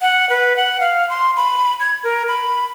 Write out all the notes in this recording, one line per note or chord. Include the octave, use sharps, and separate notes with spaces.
F#5
B4
F#5
F5
C6
B5
G#6
A#4
B5